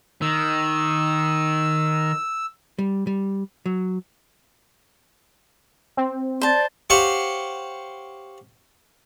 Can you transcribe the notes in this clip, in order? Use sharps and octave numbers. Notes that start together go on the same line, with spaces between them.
D#3 E6
G3
G3
F#3
C4
C5 D5 A5
G4 C5 C#5 F5 F#5